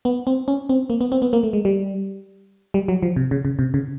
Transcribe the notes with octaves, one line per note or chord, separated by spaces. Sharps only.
B3
C4
C#4
C4
A#3
B3
C4
B3
A#3
A3
G#3
G3
G3
F#3
F3
C3
C#3
C#3
C3
C#3